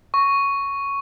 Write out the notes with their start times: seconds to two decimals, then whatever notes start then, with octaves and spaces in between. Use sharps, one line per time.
0.14 C#6